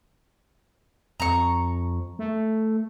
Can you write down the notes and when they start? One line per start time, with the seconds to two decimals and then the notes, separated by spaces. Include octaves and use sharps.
1.20 F2 A#5 C#6
2.19 A3